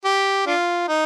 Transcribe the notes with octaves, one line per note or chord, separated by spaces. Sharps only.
G4
D4 F4
D#4